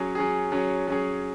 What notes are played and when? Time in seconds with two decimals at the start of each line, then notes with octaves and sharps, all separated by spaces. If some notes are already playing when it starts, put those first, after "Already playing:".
Already playing: F#3 C#4 G#4
0.15 F#3 C#4 G#4
0.52 F#3 C#4 G#4
0.88 F#3 C#4 G#4